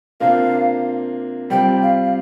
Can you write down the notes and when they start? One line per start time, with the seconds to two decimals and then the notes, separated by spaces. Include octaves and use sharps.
0.20 C3 A#3 D4 F4 C5 F5
1.50 C3 G3 C4 F4 C5 G5
1.83 F5
2.05 F5